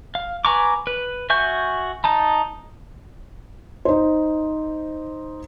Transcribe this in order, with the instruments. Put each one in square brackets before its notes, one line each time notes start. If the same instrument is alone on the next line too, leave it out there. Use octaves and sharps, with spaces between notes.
[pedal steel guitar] F5
B4 G#5 A#5 C#6 D6
B4
F#4 E5 G#5 C#6 G6
D#4 A5 A#5
[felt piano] D#4 C5